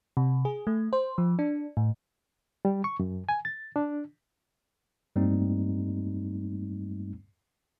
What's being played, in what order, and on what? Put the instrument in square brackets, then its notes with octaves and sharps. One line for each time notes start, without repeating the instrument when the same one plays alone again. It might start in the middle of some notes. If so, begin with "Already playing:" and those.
[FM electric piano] C3
G#4
A3
C5
F3
D4
A2
[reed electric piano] G3
C#6
F#2
G#5
A6
D4
[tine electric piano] G2 G3 A3 A#3 C4 D#4